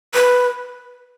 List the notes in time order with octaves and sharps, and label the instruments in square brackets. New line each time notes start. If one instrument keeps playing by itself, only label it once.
[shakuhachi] B4